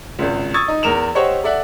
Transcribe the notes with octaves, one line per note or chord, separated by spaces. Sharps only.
G#1 C#2
C#6 D#6 E6 G#6 A6
D#4
E2 A#4 E7 F7
G4 C5 C#5 D#5 F#5 C#6
A4 D5 E5 F#5